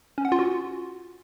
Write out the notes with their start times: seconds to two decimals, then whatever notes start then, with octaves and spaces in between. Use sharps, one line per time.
0.18 C#4
0.25 F#5
0.32 F4
0.39 F#4